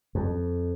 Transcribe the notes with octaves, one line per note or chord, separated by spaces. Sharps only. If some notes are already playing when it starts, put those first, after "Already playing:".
F2